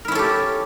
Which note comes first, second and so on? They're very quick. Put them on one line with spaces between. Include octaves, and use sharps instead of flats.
A#4 E4 C#4 A4 G4